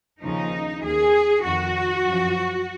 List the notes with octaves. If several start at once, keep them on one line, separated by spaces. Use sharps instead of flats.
D#2 C#3 F3 D#4
D#2 D#3 G#4
F2 D#3 F#4
F#2 F3